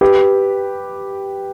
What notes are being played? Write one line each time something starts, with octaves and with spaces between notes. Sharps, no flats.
G4 B4